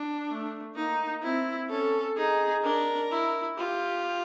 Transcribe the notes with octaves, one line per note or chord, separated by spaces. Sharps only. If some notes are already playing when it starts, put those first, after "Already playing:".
Already playing: D4
A3
A#3 D#4
C4 E4
C#4 A4
D#4 G#4
D4 A#4
E4
F4 G4